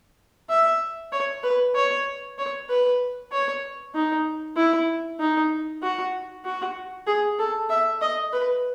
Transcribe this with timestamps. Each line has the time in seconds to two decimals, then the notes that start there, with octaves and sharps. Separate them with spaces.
0.50 E5
1.12 C#5
1.43 B4
1.75 C#5
2.38 C#5
2.69 B4
3.32 C#5
3.95 D#4
4.57 E4
5.20 D#4
5.83 F#4
6.45 F#4
7.07 G#4
7.39 A4
7.70 E5
8.01 D#5
8.33 B4